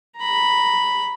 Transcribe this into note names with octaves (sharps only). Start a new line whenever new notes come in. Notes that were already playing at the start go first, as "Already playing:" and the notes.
A#5 B5